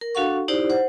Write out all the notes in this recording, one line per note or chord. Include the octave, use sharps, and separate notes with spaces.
A#4
D4 F#4 A4 F5 F#5 C#6
D#4 E4 G4 C5 D5
C5 F#5